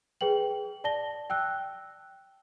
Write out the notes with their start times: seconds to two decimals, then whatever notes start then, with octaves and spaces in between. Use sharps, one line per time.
0.21 G#4 B4 G5 F#7
0.84 D5 A5 A#6 G7
1.30 G5 E6 F#6